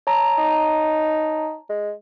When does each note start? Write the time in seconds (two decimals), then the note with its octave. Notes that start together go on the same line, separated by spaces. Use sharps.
0.07 C#5 A5 A#5
0.38 D#4
1.69 G#3